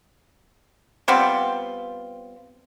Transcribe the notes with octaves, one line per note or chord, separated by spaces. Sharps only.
G3 B3 C4 F4